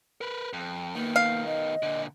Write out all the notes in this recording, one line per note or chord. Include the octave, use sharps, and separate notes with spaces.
A#4 B4
F2
D#3 A#3 B3
F5
D#5
A#2 D3